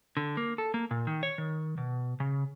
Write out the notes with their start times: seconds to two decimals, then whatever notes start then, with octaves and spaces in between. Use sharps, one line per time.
0.17 D3
0.37 A#3
0.58 A4
0.74 A#3
0.91 A#2
1.07 D#3
1.23 C#5
1.38 D#3
1.78 B2
2.20 C#3